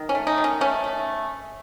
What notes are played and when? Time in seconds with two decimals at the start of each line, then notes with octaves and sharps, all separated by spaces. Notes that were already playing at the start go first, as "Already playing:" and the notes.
Already playing: D#3
0.09 C#4
0.15 A3
0.27 D#4
0.38 D#3
0.44 C#4
0.61 A3 C#4
0.84 A3